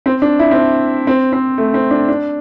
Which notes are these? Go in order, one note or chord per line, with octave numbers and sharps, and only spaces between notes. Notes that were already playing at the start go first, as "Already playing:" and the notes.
C4
D4
E4
C4
D4
C4
C4
A3
C4
D4
D4